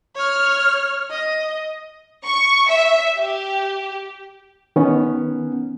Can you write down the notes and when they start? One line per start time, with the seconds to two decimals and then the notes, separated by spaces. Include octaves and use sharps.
0.16 C#5 F6
1.10 D#5
2.24 C#6
2.68 E5
3.17 G4
4.76 D#3 B3 C#4